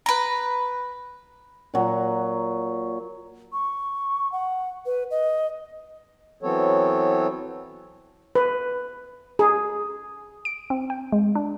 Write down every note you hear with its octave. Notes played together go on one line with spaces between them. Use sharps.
B4 A#5
A#2 F#3
C#6
F#5
B4
D#5
E3 F#3 B3 C4 A4 C#5
B4
G#4
D7
C4
G5
G#3
D4